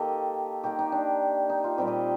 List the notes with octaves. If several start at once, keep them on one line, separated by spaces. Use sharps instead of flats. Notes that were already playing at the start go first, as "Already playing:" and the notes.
Already playing: D#3 A#3 G4 A4 D#5
D#3 A#3 G4
D#4
D4
D#4
F4
A#2 G3 C4 G4
D#5